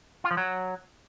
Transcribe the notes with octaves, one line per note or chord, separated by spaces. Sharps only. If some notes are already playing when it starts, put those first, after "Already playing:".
F4
F3
F#3